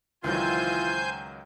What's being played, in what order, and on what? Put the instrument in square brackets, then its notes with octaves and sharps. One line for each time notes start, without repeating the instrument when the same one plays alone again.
[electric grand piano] C#2 D#3 F#3 [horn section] E3 F4 [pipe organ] C5 G#5 G6